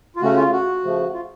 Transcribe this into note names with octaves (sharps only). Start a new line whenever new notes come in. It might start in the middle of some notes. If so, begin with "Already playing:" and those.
F4
C#3 A3 C#4 F#4
F4
F#4
C#3 F3 A3
F4